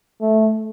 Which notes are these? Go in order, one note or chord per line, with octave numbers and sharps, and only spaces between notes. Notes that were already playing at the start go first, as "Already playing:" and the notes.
A3